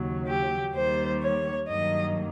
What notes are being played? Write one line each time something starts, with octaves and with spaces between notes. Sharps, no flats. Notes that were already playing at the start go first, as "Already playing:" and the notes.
Already playing: D#2 C#3 F#3
G4
D#2 D#3 G3 A#3 C5
C#5
G2 D#3 F#3 A#3 D#5